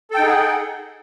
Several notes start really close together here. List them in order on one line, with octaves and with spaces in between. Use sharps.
A4 G5 D#4 G#4 F#5